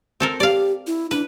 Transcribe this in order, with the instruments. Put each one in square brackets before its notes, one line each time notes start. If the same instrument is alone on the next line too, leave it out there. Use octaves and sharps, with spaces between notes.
[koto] C4 A4 A#4
[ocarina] G4 [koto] D5 F5
[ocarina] E4
[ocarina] D4 [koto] B4